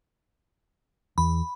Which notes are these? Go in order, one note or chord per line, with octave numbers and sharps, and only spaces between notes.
E2 B5